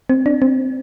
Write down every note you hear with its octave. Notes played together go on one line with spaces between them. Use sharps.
C4
D4
C4